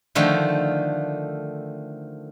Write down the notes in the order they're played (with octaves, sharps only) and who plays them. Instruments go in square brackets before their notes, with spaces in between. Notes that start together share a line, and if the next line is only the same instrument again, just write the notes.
[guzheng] D3 D#3 F3 A3